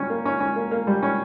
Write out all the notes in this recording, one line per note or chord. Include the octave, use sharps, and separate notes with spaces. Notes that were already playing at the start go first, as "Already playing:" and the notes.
Already playing: G3 C#4
A#3
C#4
C#4
A#3
A#3
G3
C#4